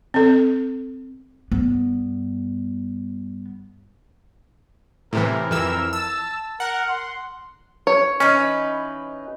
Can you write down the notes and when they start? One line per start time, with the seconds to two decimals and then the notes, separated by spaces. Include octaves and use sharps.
0.14 C4 A4
1.52 G2 B3
5.13 A2 C3 E3 A#4
5.51 F2 E3 A#4 E6
5.93 A5 E6
6.60 A#4 F#5
6.89 C6
7.87 C#5
8.20 E3 C#4 D#4 B4